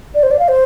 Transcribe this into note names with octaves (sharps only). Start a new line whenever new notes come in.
D5
C5
D5
F5
C5